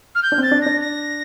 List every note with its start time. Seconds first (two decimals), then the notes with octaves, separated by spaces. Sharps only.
0.15 F6
0.23 G6
0.32 D4
0.38 C4
0.43 A6
0.51 D4
0.62 D4 A#6
0.81 A#6